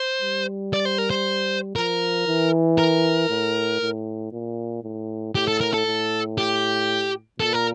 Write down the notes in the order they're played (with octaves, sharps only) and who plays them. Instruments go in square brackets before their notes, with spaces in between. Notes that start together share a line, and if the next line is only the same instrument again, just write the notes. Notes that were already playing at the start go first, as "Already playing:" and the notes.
Already playing: [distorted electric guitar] C5
[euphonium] G3
[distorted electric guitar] D5
C5
A#4
C5
[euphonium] F3 [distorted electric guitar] A#4
[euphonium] E3
[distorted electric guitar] A#4
[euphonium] A2
A2
A#2
A2
[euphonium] A2 [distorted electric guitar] G4
[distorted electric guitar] A4
A#4
A4
[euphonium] A2
[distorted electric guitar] G4
[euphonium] A#2 [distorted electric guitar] A4
[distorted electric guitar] A#4